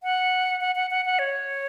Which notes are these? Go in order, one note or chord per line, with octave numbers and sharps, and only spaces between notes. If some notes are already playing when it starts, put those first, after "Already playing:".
F#5
F#5
F#5
F#5
F#5
C#5